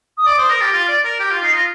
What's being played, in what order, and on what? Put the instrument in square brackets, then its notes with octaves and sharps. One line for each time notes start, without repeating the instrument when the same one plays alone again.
[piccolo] D#6
[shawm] D5 [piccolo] D6
[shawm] C5 [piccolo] D#6
[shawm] A#4 [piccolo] A#6
[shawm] G4 [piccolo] A6
[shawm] F4
D5
A#4
[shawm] G4 [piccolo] G6
[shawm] F4 [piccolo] A6
[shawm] D#4 [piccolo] C7
[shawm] F4 [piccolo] A#6